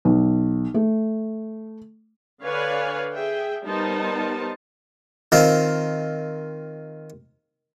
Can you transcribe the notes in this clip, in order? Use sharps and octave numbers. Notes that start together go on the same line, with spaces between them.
B1
A3
D3 B4 C#5 D5 F5 G#5
G#4 E5 G5
G3 B3 D#4 A#4 C5 A5
D#3 C4 F4